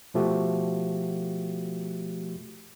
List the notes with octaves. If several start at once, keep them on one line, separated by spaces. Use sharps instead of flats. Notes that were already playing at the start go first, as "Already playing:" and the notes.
B2 F3 A3 F#4 G4